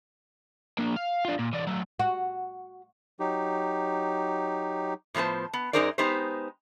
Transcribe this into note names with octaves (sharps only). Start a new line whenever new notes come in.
A#3 D4
F5
D4 F4
A#2
E3 D4
F#3 A3
F#4
F#3 D#4 G4
A2 F3 B3 C5 A5
B3
F#2 D#4 G#4 A#4 C5 D5
G#3 B3 D#4 G4 C5